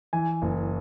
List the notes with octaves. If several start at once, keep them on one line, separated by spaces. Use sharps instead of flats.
E3 G#5
F#1